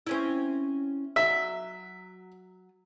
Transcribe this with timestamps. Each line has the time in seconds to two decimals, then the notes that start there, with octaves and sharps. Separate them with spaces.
0.07 C4 C#4 E4
1.16 F#3 E5